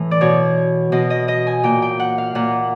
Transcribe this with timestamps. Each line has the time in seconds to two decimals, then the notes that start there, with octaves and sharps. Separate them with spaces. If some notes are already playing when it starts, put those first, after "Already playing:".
Already playing: A2 E3
0.11 D5
0.21 B2 C#5
0.92 B2 D#5
1.10 D#5
1.28 D#5
1.47 G#5
1.63 A#2 G5
1.82 G5
2.00 F#5
2.18 F5
2.35 A#2 F#5